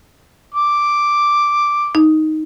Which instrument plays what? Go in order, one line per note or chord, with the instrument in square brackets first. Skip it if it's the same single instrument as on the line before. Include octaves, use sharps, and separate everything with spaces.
[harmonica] D6
[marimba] D#4